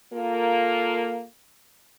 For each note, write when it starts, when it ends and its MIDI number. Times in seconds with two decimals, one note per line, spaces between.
0.13 1.24 58
0.13 1.24 65
0.13 1.24 69